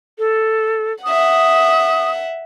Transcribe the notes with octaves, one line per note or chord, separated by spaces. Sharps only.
A4
E5 F#5 D#6